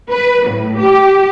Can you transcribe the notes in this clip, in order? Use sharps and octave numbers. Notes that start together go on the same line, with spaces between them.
B4
A2
G4